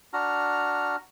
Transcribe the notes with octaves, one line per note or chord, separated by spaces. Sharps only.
D4 F#4 A#5 F6